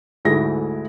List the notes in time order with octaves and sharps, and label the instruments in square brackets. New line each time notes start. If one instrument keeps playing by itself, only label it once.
[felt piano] D2 G#2 A3 E4 G#4 A#6